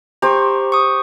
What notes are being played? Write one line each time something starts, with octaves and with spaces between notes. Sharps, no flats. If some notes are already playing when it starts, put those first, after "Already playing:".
G4 C5 A#5 C#6
C#6 D#6